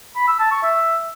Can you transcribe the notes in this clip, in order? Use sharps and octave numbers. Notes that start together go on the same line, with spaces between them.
B5
E6
A5
C#6
E5